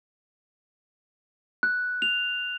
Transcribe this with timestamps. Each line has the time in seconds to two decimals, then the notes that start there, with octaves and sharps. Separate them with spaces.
1.63 F#6
2.02 F7